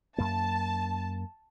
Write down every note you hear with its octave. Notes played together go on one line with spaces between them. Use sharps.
F#2 A#3 A5